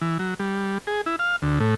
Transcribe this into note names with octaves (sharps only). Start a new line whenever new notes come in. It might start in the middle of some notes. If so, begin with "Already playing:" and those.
E3
F#3
G3
G#4
E4
F5
D2
A2